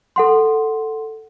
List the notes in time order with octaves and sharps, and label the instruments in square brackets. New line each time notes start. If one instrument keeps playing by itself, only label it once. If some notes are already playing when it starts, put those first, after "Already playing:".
[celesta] A4 F#5 C6